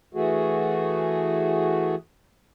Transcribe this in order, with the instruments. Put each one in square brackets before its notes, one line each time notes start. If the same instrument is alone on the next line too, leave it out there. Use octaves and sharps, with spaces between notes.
[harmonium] E3 A3 F#4 G#4